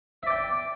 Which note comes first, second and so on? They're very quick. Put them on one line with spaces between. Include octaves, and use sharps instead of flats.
E5 D5 G5